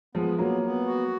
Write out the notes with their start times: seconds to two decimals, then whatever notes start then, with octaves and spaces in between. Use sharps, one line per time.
0.15 F3 G#3 B3
0.39 F#3 A#3 B3
0.63 B3
0.87 F#4